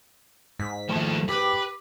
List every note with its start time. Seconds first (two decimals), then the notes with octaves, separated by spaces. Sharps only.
0.59 G#2 B6
0.89 D#2 F3 A3
1.29 G4 B4 D6